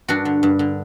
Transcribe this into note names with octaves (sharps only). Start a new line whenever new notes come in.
G2 D4 F#4
D3
G2
D3